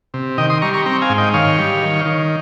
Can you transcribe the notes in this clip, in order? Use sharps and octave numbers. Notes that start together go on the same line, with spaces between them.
C3
D#3 D#5 G5
C6 D#6
G3 A#5 C#6
A#5 C#6
C4 G5 A#5
F5 G#5
G#2
D#5 G5
D#3 C#5 F5
G3
D#3
D#3